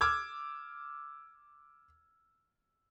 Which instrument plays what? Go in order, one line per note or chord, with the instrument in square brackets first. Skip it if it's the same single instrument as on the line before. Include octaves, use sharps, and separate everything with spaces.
[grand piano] D6 E6 F6 G#6